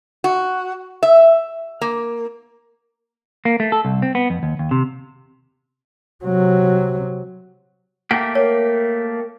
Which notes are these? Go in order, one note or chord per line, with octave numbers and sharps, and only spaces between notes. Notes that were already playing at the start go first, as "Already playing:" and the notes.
F#4
E5
A#3
A#3
A3
A4
C2
C4
B3
F2
D#2
D#2
C3
C3 F#3
A3 A#3 G4 F#5
A#4 C#5